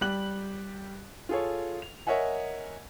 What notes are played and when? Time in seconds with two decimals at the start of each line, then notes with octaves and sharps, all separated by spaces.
0.01 G3 G4 F#6 F#7
1.29 F4 G#4 A4 C#5
1.82 F7
2.07 A#4 C#5 D#5 E5 F#5 G#5